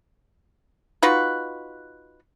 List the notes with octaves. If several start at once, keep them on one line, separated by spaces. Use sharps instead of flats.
D#4 F4 F#4 B4